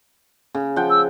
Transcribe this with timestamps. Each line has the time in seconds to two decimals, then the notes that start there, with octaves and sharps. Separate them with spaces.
0.55 C#3
0.76 F3 F#5 G5
0.90 E6